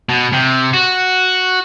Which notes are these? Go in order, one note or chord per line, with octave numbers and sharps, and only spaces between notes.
B2
C3
F#4